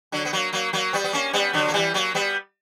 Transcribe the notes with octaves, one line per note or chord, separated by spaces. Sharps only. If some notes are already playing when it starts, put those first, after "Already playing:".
D3 F#3
B3
F#3 A#3
F#3 A#3
F#3 A#3
G3 B3
B3
A#3 C#4
G3 B3
D3 F#3
A#3
E3 G3
F#3 A#3
G3 B3